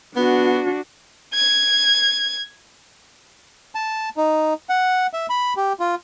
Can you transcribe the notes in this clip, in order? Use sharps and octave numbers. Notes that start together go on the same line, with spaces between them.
B3 D4 F#4
G#6
A5
D#4
F#5
E5
B5
G4
F4